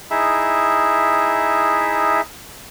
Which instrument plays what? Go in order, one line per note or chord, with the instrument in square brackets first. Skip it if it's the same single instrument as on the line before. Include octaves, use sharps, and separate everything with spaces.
[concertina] D#4 E4 G#4 E5